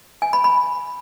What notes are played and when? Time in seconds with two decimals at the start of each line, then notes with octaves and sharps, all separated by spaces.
0.22 G#5
0.33 B5
0.44 B5